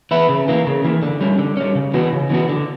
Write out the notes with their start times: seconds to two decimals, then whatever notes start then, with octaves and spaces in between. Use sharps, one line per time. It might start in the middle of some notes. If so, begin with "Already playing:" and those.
0.11 E3 B3 E4
0.29 C#3
0.48 E3 A#3
0.67 C#3
0.85 E3 A#3
1.03 D3
1.21 G3 C#4
1.39 D3
1.57 G3 C#4
1.75 C#3
1.94 E3 B3 F#4
2.13 C#3
2.30 E3 B3 F#4
2.49 D3